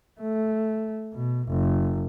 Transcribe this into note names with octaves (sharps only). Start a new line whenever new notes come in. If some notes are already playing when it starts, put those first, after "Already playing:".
A3
B2
F#1